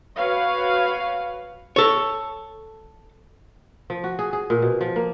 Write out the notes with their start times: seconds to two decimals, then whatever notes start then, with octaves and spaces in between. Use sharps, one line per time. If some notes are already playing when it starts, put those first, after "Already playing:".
0.18 F#4 B4 C#5 F5
1.76 A4 C#5
3.90 F3
4.04 F#4
4.19 G#4
4.33 G#4
4.50 A#2
4.62 B2
4.81 F3
4.96 A#3